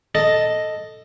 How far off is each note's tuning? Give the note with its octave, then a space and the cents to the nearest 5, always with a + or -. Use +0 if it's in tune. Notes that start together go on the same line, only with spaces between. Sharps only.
A4 +5 D#5 +0 A5 +5